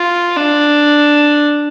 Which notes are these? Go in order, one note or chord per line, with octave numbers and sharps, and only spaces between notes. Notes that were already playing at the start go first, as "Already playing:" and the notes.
Already playing: F4
D4